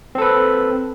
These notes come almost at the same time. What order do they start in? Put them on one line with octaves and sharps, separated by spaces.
C4 A4 B4